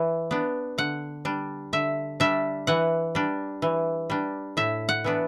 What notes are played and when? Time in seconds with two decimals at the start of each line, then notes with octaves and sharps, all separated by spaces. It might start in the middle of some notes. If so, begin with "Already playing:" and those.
Already playing: E3
0.31 B3 D4
0.78 D3 F#5
1.25 G3 D4
1.73 D3 E5
2.20 G3 D4 E5
2.67 E3 F#5
3.15 G3 D4
3.62 E3
4.10 G3 D4
4.57 A2 E5
4.89 F#5
5.04 E3 B3 D4